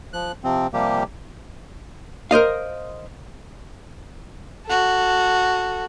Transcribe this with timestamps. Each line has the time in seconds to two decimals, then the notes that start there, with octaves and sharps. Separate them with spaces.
0.13 F3 F#6
0.44 C3 F3 C4
0.73 C3 F3 G3 A#3 G4
2.31 A#4 C5 D#5 F5
4.66 F#4 A4